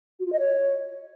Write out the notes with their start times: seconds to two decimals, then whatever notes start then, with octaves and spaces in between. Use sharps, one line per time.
0.19 F#4
0.26 F4
0.32 D#5
0.39 C#5